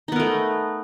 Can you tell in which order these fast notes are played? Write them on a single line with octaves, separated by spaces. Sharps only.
D#4 B3 A#4 A3